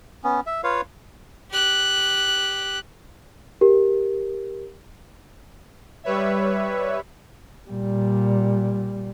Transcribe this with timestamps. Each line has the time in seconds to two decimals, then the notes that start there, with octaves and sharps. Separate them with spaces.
0.24 B3 C#4
0.46 E5
0.64 F4 B4 C#5 F5
1.51 G4 F#6
3.61 G4 A#4
6.04 G3 B4 C#5 E5
7.68 A#2 G3